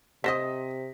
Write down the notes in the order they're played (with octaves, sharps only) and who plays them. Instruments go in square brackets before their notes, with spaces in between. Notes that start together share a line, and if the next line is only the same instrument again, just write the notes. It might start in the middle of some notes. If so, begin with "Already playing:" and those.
[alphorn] C3 [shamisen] C4 C5 D#5 [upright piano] D#6 A#6 B6